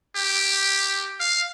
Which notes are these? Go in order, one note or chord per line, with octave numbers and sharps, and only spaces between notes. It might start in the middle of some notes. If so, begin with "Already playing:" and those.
G4
F5